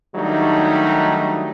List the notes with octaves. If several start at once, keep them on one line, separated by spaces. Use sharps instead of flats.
D#3 F#3 G3 A3 D4 D#4